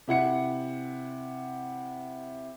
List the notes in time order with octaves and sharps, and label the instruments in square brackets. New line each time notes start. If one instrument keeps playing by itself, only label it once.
[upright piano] C3 E4 F#5 C#7